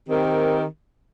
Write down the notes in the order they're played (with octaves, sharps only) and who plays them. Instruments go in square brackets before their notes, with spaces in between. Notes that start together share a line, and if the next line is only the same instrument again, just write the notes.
[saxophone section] D#3 C4 G4 A#4